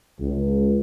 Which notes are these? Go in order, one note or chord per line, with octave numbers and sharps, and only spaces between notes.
C#2